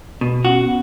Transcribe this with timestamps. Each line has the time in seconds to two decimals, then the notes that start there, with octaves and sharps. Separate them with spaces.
0.21 B2 B3
0.44 C#4 F#4